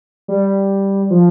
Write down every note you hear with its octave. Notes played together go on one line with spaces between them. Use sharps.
G3
F3